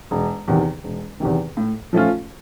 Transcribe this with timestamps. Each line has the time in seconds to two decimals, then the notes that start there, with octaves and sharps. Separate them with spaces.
0.11 E1
0.48 E2 C3 D#3
0.84 E1
1.20 E2 C3 D#3
1.57 A2
1.93 F3 A3 C#4 F4